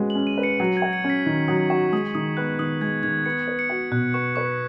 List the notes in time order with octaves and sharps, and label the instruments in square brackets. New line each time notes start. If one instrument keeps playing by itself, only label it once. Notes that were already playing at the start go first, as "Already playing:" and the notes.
Already playing: [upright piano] G#3 C#4 F#4 B4
[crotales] F#7
[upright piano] C#4
[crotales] D#7
[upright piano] B4
[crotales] C#7
[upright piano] F#3 [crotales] C#7
[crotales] G#6
[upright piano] F#4
[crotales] C#7
[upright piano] C#4
[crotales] B6
[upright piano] D#3
[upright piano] F#3 [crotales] D#6
[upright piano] F#4 [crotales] C#6
[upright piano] G#3 [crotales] D#6
[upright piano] D#3 [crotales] D#6
[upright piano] B3 [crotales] F#6
[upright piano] D#3 [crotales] D#6
[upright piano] G#3 [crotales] G#6
[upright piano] D#3 [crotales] G#6
[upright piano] B3 [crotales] C#7
[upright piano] B4
[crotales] C#7
[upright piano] F#4
[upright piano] B2 [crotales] F#6
[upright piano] B3 [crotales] C#6
[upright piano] B4 [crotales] C#6